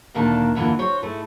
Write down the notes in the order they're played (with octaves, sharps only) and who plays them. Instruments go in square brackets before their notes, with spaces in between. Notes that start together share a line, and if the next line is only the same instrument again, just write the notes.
[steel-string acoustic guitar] D2 A#2 D#3 A#3 D4 A5
F2 D3 E3 A3 A#3 F4
F#4 C5 C#5
G#2 A3 E4 D#5